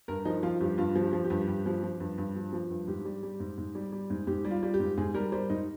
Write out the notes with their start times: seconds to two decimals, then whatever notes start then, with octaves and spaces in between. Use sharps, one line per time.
0.08 G2 A#4
0.25 F3 D#4
0.43 F3 F4
0.61 G2 G4
0.78 G2 F4
0.96 F3
1.01 G4
1.13 F3
1.24 G4
1.30 G2
1.48 G2
1.66 F3
1.83 F3
2.00 G2
2.18 G2
2.35 F3
2.53 F3
2.70 G2
2.87 G#2 G4
3.05 G3
3.23 G3
3.40 G#2
3.58 G#2
3.75 G3
3.92 G3
4.10 G#2
4.27 G#2 G4
4.45 G3
4.51 F4
4.63 G3
4.74 G4
4.80 G#2
4.98 G#2 G#4
5.14 G3 A#4
5.32 G3 C5
5.50 G#2 D#4